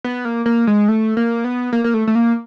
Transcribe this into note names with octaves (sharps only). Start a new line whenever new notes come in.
B3
A#3
A#3
G#3
A3
A#3
B3
A#3
A#3
A3
A3
A#3